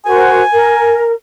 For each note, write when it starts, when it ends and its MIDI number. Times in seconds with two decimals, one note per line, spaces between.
0.06 0.41 66
0.06 0.41 70
0.06 0.41 72
0.06 1.06 80
0.53 1.11 70